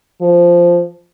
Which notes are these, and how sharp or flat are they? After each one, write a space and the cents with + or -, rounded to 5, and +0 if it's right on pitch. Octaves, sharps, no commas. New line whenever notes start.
F3 -5